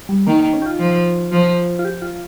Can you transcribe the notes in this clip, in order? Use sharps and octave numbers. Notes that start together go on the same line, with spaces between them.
G3
D#3 A#3
A#3
C#4
G4
F4
F3
F3
F4
G4
F4